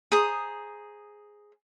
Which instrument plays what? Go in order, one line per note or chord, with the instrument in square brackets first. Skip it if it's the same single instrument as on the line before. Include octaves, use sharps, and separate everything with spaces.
[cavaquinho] G#4 C5 A#5 D#6